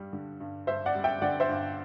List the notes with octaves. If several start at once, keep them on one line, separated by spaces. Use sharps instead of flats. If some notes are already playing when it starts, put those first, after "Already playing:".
Already playing: G2 G3
D3
G2
G2 C5 E5
D5 F#5
G3
E5 G5
D3 D5 F#5
C5 E5
G2